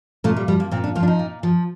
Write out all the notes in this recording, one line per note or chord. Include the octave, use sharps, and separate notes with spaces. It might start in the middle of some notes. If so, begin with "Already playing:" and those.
A#2 A3
G3
F3 G3
A#3
A#2 C4
D4
F3 F4
D4
D#4
A#2
F3